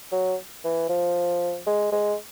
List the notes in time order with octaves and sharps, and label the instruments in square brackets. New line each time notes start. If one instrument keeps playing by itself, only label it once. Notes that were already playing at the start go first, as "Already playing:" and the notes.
[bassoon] F#3
E3
F3
G#3
G#3